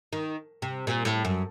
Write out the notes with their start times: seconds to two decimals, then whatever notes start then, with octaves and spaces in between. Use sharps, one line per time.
0.13 D#3
0.62 C3
0.87 A#2
1.05 A2
1.25 F#2